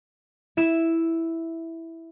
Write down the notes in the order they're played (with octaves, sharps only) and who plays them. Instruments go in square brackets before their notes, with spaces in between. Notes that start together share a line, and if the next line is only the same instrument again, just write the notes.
[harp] E4 E7